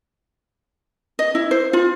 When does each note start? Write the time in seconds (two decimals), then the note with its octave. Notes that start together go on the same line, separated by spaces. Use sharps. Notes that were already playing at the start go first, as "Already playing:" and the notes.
1.19 D#5
1.35 E4
1.51 C5
1.73 F4